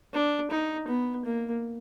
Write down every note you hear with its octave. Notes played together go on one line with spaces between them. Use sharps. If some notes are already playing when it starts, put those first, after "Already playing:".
D4
D#4
B3
A#3